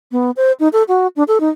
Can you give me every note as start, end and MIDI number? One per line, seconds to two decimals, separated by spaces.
0.12 0.31 59
0.37 0.52 72
0.60 0.68 63
0.73 0.83 69
0.88 1.07 66
1.16 1.23 62
1.28 1.38 69
1.40 1.49 63